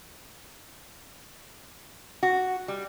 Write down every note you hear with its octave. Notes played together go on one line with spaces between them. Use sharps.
F#4
G3